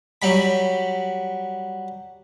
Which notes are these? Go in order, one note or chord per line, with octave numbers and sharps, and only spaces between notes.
F#3 G3 B5